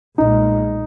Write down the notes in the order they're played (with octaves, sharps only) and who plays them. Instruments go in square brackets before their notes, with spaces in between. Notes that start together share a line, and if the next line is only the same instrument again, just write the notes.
[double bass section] B1 A#2 G#3 [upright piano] D#4